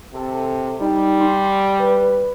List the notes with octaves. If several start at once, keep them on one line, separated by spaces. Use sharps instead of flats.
C3 A4
G3 D#4
C6
B4